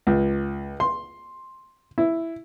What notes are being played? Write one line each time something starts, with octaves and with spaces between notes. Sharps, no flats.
C#2
C6
E4